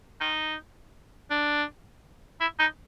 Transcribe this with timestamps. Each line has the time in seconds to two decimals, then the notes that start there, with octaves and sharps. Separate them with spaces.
0.21 D#4
1.30 D4
2.41 E4
2.60 D#4